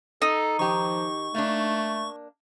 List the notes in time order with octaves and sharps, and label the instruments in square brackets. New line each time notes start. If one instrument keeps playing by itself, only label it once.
[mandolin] D#4 [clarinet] A4
[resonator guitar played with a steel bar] D#3 G4 [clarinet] F3 [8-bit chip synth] C#6
[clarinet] A3 [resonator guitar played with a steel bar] A#3 D4